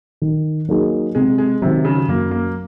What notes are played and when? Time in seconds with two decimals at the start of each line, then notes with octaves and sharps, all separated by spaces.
0.22 D#3
0.69 F#3 A#3 D#4 G#4
1.15 C3 G#3
1.38 G#3
1.62 C3 D#3 F#3
1.85 C#3
2.08 F#2 A#3
2.31 A#3